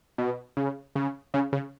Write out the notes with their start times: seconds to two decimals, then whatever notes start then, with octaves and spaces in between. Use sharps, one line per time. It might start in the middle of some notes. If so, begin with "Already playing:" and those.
0.18 B2
0.57 C#3
0.96 C#3
1.34 C#3
1.53 C#3